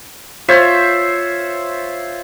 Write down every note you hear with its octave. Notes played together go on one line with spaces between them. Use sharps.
F4 C5 C#5 E5